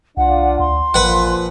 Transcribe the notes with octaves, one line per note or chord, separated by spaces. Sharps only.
C2 D4 F4 D5 F#5
D2 C6
A1 A#2 F3 B4 F#5